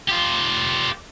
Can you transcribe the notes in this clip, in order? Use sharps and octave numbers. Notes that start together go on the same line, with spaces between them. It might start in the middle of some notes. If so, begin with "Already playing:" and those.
F4 G4